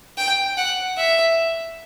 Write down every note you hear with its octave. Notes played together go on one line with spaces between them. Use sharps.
G5
F#5
E5